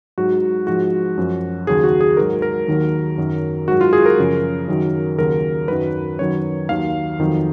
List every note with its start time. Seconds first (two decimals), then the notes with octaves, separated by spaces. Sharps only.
0.18 G#2 F#3 F#4
0.67 G#2 F3 F#4
1.18 F#2 F3
1.67 D#2 C#3 F#3 G#4
1.84 F#4
2.01 G#4
2.17 G#2 F#3 A#4
2.42 A#4
2.68 D#2 D#3 F#3
3.18 F#2 D#3 F#3
3.68 G#2 F#3 F#4
3.81 F4
3.93 G#4
4.06 A#4
4.19 F#2 C#3 F3
4.68 F#2 D#3 F#3
5.18 D#2 C#3 F#3 A#4
5.68 F#2 D#3 F#3 B4
6.19 F#2 D#3 F#3 C#5
6.69 D#2 D#3 F#3 F5
7.19 F2 D#3 F#3